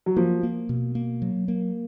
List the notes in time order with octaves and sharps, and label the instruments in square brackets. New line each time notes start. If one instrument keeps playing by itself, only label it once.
[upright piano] F#3
[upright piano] F3 [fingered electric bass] A#3
[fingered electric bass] A#3
B2
A#3
F#3
A#3